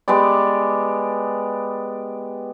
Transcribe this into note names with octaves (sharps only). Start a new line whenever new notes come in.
G#3 B3 G4 D5